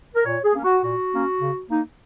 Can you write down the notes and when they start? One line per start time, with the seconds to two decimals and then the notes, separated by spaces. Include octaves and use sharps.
0.15 A#4
0.25 A#2 C#5
0.44 G#4
0.54 A#3 C#4
0.64 F#4
0.83 A#2 F#4
1.12 A#3 C#4
1.40 C#3
1.69 A#3 D#4